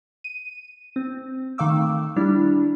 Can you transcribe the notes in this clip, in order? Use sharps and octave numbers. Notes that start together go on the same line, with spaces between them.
D#7
C4
D#3 A3 F5 D6 E6
G3 D4 E4